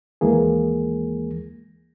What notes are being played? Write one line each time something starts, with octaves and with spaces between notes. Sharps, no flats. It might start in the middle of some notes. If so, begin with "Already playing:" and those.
D#2 E3 G#3 A#3 G#4